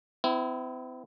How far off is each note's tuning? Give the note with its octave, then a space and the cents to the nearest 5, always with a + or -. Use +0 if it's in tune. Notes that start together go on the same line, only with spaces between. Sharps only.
C4 -45 E4 +0